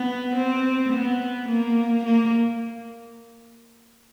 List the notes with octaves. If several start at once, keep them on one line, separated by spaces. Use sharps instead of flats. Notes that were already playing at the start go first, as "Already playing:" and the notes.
Already playing: B3
C4
B3
A#3
A#3